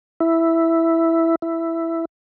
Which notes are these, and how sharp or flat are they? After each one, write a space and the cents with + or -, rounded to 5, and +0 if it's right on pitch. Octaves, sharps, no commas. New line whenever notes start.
E4 +0
E4 +5